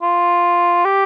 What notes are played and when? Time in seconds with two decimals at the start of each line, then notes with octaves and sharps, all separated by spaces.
0.02 F4
0.85 G4